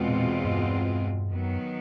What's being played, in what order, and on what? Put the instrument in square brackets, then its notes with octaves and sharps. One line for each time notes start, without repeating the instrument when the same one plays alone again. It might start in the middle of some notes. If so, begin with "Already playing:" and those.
Already playing: [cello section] E2 B2 G#3 C4 F4
[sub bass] A#2
G2
[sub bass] F#2 [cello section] D#3 F#3 B3